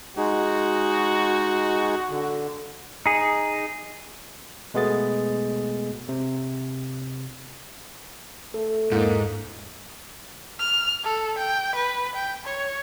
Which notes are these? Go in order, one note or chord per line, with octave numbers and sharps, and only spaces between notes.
G#3 D#4 F#4 G#4
D3
D#4 G#4
B2 G#3 A3 B3 G#4 A6
C3
A3 A4
E2 G#2 A#3 E4 G6
F6
A4
G5
B4
G5
C#5